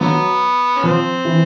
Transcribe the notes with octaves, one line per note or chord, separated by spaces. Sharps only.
D3 F#3 B3
C#4
F3 C4
E3